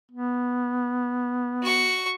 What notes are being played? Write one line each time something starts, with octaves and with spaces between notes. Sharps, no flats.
B3
F#4 C#6